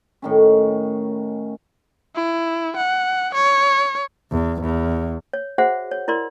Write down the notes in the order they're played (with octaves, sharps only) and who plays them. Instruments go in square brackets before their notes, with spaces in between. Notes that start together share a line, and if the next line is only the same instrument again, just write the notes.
[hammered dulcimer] A2 D#3 C#4
[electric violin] E4
F#5
C#5
[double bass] E2
E2
[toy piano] C#5
F#4 G#4 C5 E5 F#5
C#5
E4 A#4 D5 C6